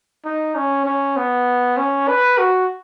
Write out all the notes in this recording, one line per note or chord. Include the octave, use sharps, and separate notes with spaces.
D#4
C#4
C#4
B3
C#4
B4
F#4